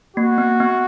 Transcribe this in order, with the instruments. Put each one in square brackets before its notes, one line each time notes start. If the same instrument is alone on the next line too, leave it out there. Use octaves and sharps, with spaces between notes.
[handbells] A#3 [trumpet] F#4
[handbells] B3
B3